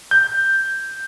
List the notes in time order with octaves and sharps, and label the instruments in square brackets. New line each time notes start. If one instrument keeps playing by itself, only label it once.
[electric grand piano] G6